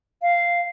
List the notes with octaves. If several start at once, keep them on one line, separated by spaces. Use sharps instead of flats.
F5